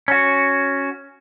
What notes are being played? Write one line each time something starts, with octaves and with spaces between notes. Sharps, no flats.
C#4 F#4